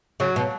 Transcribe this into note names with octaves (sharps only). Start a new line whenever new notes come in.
C#3 F#3
B2